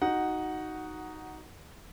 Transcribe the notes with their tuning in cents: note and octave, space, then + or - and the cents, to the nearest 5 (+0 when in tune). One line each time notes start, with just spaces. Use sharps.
D#4 +0 F#4 +10 F#5 +0